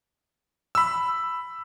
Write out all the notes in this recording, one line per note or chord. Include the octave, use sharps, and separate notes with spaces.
B5 E6